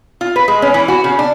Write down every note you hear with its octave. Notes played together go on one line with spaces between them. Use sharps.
F4
B4
G#3
C#4
E3
F#4
C#3
D4